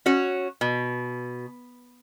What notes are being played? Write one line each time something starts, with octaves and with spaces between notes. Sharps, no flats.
C#4 F#4 C#5
B2